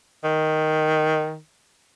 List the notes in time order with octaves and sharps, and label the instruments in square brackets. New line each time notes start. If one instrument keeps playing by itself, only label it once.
[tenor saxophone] D#3